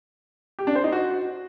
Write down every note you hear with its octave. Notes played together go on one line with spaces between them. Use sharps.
G4
D4
C5
D#4
F#4